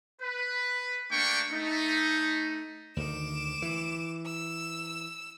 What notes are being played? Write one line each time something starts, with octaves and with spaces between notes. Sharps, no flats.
B4
A3 A#3 D4 G5 C#6
A3 D#4
D2 D#3 D6 E7
E3
E6